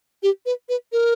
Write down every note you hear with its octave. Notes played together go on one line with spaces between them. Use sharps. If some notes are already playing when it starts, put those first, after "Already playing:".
G4
B4
B4
A#4